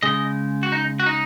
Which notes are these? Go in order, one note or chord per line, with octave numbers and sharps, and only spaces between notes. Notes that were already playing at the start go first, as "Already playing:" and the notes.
C#3 G#3 D#5
F#4
D#4
F#4
D#4